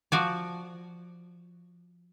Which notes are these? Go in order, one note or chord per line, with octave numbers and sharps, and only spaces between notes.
F3 F#4 D5